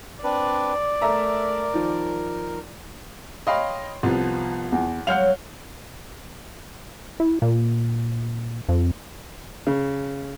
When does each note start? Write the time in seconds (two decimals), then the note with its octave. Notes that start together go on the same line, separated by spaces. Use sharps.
0.24 C4 D4 B4 D5
1.02 A3 A#4 E5 A#5
1.74 D#3 F3
3.47 C#5 D#5 F5 G5 B5 C6
4.03 C2 F3 B3 F4
4.72 E2
5.07 F#3 G#3 C#5 F5 F#5 F6 G6 F7
7.20 E4
7.42 A#2
8.69 F2
9.67 C#3